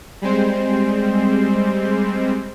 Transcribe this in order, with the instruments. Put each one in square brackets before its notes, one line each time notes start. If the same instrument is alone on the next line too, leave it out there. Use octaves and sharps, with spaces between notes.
[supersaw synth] G3 G#3 C4 C5